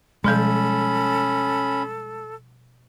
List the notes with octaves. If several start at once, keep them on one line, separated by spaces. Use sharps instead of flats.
B2 F3 G3 G#3 C#4 A4 B5